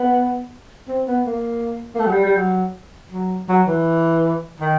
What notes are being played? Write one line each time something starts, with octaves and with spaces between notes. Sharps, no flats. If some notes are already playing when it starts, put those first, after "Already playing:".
Already playing: B3
C4
B3
A#3
A#3
A3
F#3
G3
G3
F#3
F#3
F#3
E3
D#3